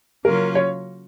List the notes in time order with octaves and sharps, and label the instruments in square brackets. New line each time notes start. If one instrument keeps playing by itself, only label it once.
[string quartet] C#3 F#3 A#3 C#4 F4 [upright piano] A#4
[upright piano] C#5